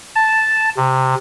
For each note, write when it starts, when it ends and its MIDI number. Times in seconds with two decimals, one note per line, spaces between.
0.16 0.69 81
0.77 1.15 48